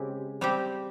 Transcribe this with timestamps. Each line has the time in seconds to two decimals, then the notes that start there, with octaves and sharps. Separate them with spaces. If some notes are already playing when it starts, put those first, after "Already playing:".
Already playing: C#3 G#3 C4 G4
0.41 G3 C4 G4